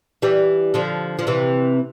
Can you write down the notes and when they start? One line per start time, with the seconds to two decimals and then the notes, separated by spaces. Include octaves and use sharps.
0.22 E3 G3
0.74 D3 F3
1.19 F3
1.27 C3 E3